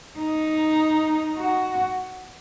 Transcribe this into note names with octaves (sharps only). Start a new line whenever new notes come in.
D#4
F#4